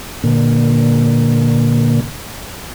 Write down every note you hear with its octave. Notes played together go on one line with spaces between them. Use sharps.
A#2 D3 A#3